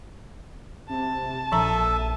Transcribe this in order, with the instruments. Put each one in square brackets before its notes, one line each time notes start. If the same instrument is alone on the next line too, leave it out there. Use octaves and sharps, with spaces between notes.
[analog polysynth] C3 [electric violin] A5
[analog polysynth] A#1 D#7 [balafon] F3 A#5 [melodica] A4 E5